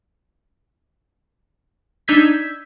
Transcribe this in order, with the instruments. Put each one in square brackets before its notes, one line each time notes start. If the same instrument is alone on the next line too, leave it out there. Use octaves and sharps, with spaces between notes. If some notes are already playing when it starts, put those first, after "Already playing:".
[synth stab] D4 D#4 E6 G6 G#6 B6